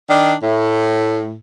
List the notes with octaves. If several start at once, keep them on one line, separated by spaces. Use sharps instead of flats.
D#3 D4
A2